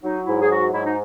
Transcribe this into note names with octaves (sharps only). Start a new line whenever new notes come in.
F#3 D#4
G#2 E4
G#4
F#3 F#4
G#2 E4
D#4